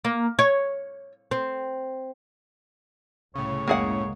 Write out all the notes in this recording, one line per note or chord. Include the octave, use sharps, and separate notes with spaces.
A#3
C#5
C4
C2 A2 C#3 C#5
F#1 C#2 G#3 A#3 G#4 F#5